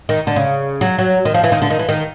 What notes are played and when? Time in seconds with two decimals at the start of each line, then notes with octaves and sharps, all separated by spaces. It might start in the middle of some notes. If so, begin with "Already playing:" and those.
0.09 D#3
0.27 D3
0.36 C#3
0.81 F#3
0.99 F#3
1.25 D#3
1.34 F3
1.44 E3
1.52 D#3
1.62 D3
1.70 D#3
1.79 E3
1.89 D#3